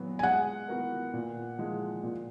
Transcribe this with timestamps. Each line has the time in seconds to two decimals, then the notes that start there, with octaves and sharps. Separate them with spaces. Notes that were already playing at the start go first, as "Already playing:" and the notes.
Already playing: A#2 F#3 B3 F#4
0.19 G#5
0.23 G#3 F#5
0.68 B3 F#4 A#4
1.13 A#2
1.58 F3 G#3
2.03 A#2